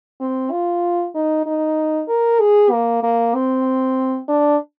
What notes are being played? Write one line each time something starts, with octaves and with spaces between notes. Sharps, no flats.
C4
F4
D#4
D#4
A#4
G#4
A#3
A#3
C4
D4